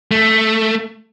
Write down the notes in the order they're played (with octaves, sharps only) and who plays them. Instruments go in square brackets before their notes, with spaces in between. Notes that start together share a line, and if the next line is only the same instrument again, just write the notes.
[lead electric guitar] A3